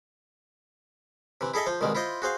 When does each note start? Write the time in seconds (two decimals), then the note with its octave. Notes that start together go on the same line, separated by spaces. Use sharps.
1.41 C3 E3
1.54 E4 G#4 A4 D#5 E5
1.67 F3 C5
1.81 C2 B2 D#3 G#3
1.95 E4 F4 C5 D#5
2.22 F#4 G#4 C5 F5